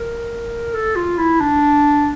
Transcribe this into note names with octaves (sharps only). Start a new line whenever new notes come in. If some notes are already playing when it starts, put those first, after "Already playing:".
Already playing: A#4
A4
F4
E4
D4